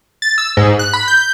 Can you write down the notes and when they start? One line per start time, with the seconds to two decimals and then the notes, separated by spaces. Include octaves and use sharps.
0.22 A6
0.38 E6
0.57 G#2
0.79 F#6
0.93 B5
1.08 G6